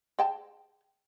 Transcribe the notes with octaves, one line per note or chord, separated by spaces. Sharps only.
G#4 G5 A5